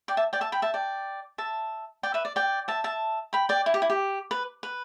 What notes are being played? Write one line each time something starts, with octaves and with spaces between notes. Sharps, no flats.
D5 G5
E5 A5
D5 G5
E5 A5
G5 B5
E5 A5
D5 G5
E5 A5
D5 G5
B4 E5
D5
D5 G5
E5 A5
E5 A5
G5 B5
D5 G5
E4
G4
E4
G4
B4
B4